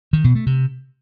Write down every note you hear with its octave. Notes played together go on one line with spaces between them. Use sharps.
D#3
B2
A3
C3